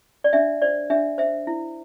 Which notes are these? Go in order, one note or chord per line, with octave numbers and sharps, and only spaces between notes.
D5
D4 E5
C5 D5
D4 E5
C5 E5
E4